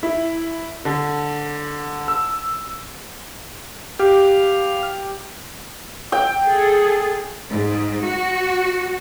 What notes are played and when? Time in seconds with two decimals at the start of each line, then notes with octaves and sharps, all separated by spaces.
0.03 E4
0.85 D3
2.08 E6
3.99 G4 F5
6.12 G5
6.43 G#4 A4
7.49 G#2
8.04 F#4